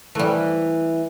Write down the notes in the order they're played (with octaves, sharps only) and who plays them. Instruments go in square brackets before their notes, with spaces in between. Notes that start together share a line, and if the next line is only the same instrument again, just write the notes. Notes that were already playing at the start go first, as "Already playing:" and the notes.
[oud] E3 [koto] G3 A3